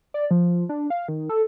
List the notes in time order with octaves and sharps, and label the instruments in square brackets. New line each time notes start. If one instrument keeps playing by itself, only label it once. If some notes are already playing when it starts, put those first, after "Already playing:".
[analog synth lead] D5
F3
D4
F5
D#3
A4